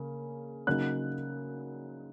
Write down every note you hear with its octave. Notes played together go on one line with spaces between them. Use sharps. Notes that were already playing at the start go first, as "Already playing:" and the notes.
Already playing: C#3 A#3 C#4
C#3 F#3 A#3 D#4 F#6